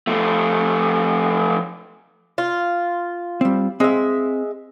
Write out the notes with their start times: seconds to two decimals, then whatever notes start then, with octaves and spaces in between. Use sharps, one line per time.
0.07 F3 A3
2.38 F4
3.41 G3 C4
3.80 G#3 C4 E5 F5